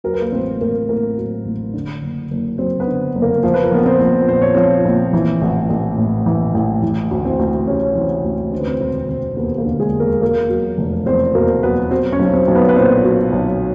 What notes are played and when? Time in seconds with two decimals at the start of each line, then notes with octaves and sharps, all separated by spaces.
0.04 F#3 A#4
0.13 B4
0.22 A#3 A#4
0.32 A1 C4 C5
0.61 A1 A#3 A#4
0.89 A2 A#3 A#4
1.18 F#3
1.45 A1
1.74 D3
2.02 F#1
2.31 F#1
2.58 F#2 C4 C5
2.80 B3 B4
2.87 D3
3.15 F#1
3.22 A#3 A#4
3.43 F3 C5
3.54 B4
3.64 A#4
3.71 A#1 B3 B4
3.86 C4 C5
4.00 A#1
4.28 A#2 C5
4.42 C#5
4.54 F3 C4 C5
4.85 A#1
5.13 E3
5.41 A1
5.70 A1
5.98 A2
6.26 E3
6.55 A1
6.82 E3
7.11 D2
7.25 C4 C5
7.39 D2
7.67 C3 C#4 C#5
7.95 E3 C4 C5
8.24 D2
8.52 D3 C5
8.60 B4
8.67 C4 C5
8.80 E1 C4 C5
9.09 E1 C4 C5
9.37 D#2 B3 B4
9.58 A#3 A#4
9.65 D3
9.79 G#3 G#4
9.94 E1
10.00 A#3 A#4
10.21 B2 A#3 A#4
10.50 F#3
10.78 F1
11.06 E2 C4 C5
11.35 B2 A#3 A#4
11.63 F#3 B3 B4
11.91 F#3 C4 C5
12.12 C#4 C#5
12.19 B1
12.33 C4 C5
12.48 B1
12.55 B3 B4
12.69 B4
12.76 A#2 C4 C5
13.04 F#3
13.33 B1